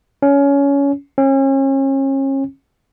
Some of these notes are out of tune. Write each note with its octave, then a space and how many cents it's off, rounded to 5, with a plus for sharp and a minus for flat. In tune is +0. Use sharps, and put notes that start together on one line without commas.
C#4 +20
C#4 -35